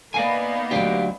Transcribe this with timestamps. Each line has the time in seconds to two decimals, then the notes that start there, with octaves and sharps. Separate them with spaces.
0.14 A#3 B3 D#4 D5 F5 G#5
0.71 D2 F#3 G4 F5 G5